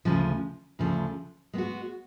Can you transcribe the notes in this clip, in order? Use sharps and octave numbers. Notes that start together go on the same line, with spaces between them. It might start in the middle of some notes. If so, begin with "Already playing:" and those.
D2 C#3 F3 G#3
D2 C#3 F3 A3 D4
G#3 B3 F#4